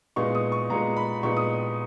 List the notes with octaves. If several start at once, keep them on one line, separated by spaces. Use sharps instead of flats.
A#2 G#3 B3 D#4 C#6
D#6
C#6
A#2 G#3 B3 D#4 A#5
B5
A#2 G#3 B3 D#4 C#6
D#6